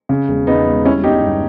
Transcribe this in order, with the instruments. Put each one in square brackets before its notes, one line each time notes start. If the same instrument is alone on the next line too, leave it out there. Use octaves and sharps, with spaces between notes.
[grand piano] C#3
E1
E1 B3 D#4
E1
G3 C#4 E4
G1 D#4 G4
G2